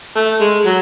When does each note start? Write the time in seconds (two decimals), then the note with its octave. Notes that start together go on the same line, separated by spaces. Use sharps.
0.15 A3
0.40 G#3
0.65 F#3